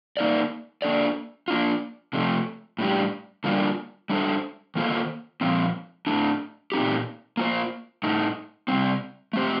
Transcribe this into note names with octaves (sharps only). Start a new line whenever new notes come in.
A#3 D#4 A#4 D5
A#3 D4 A4 D5
A#3 D4 F4
C3 F3 A3
A2 G3 D4 G4
D3 G3 A#3 D4 F4
G3 D4 A4 C5
D#3 A#3 F4 A4 C5
A#2 F3 C4
A2 A3 D4
A#2 A3 C4 D#4 G4
A#3 F4 A4 C5
A2 A3 D#4
C3 G3 C4
A3 C4 G4 C5